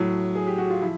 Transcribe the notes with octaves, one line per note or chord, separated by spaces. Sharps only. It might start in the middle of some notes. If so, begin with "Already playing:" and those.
Already playing: A2 F#3
G#4
G4
F#4
F4
F3 E4